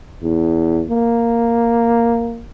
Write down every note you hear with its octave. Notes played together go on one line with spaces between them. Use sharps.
E2
A#3